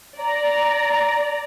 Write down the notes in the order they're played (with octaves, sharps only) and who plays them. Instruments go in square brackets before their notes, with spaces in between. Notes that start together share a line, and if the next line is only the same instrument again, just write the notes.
[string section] D5 A#5